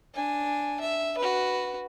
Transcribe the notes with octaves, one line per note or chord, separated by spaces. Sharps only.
D4 G#5
E5
F#4 B4